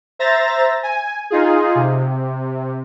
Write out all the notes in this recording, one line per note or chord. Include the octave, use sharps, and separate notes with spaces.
C5 E5 A#5 A6 A#6
G#5
D#4 F4 G#4
C3